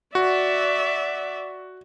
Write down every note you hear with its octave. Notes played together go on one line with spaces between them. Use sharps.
F#4 D5 E5